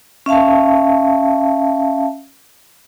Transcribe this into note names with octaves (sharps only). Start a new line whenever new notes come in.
C#4 E5 F5 A5